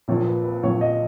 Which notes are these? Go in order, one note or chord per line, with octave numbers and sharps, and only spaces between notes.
A#1 A#2 F3 C#5
B4
B4
A#1 A#2 F3 C#5
D#5